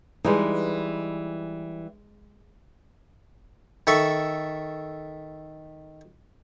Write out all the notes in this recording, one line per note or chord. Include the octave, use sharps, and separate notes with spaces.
E3 G3 G#3 D#4
D#3 A4 E5 C#6